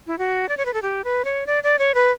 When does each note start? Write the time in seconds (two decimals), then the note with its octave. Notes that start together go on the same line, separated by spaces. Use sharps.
0.07 E4
0.18 F#4
0.49 D5
0.57 C#5
0.66 B4
0.74 A4
0.82 G4
1.04 B4
1.25 C#5
1.47 D5
1.63 D5
1.79 C#5
1.94 B4